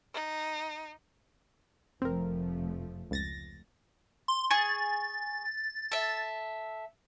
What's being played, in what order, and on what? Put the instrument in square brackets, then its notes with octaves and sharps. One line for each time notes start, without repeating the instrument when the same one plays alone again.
[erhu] D#4
[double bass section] F1 F3 A3 [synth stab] C4 A#4
[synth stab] C#2 A6 A#6
[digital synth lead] C6
[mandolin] G#4 C#6 [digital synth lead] A6
[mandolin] A4 E5